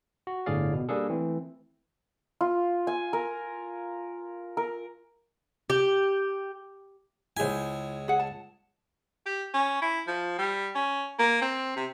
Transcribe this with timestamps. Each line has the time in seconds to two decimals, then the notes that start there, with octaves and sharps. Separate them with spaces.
0.27 F#4
0.46 G1 A2 D3 G#4 D5 F5
0.73 B2
0.89 G3 A#3 D4 G#4 A4
1.09 E3 A3 C4
2.41 F4
2.87 G#5
3.13 A#4
4.57 A#4
5.70 G4
7.37 C#2 E4 G#4 C5 G#5
8.08 G#4 F#5
8.20 A5
9.26 G4
9.54 C#4
9.82 E4
10.08 F3
10.38 G3
10.75 C#4
11.19 A#3
11.42 C4
11.77 C3